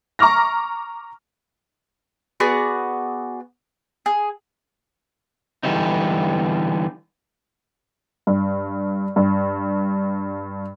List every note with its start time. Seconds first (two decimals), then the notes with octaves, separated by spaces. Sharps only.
0.19 A#5 C#6 D6 F6 A#6
2.40 B3 F#4 G#4 D5
4.06 G#4
5.63 D3 E3 G3 B3 C4 D#4
8.27 G2
9.16 G2